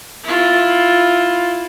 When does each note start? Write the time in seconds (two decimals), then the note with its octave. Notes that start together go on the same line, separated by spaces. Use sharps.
0.24 E4 F4